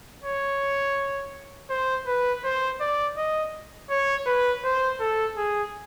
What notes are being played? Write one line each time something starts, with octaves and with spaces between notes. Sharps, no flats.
C#5
C5
B4
C5
D5
D#5
C#5
B4
C5
A4
G#4